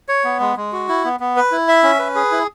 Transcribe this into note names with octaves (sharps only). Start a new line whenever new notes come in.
C#5
B3
G#3
G#3
F#4
E4
B3
B3
B4
E4
E5
C#4
B4
G#4
E4